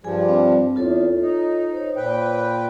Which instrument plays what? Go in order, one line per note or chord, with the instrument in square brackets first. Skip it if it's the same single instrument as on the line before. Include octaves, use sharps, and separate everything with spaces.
[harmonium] G2 F3 G3 [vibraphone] G#4 G#5
[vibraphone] C4 D4
[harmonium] E2 [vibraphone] F4 A4 C#5
[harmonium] D#4
[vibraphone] C5 C#5
[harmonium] A#2 B4 G5